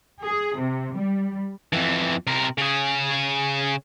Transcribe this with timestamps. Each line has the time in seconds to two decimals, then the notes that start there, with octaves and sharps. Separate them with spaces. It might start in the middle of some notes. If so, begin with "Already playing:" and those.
0.24 G#4
0.57 C3
0.95 G3
1.73 F2 E3
2.27 C3 A#4
2.58 C#3 G#4